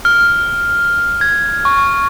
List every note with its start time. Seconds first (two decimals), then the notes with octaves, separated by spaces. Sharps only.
0.05 F6
1.21 G#6
1.65 C#6